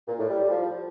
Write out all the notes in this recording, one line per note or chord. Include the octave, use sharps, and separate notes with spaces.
A#2
A2
G3
G3
F3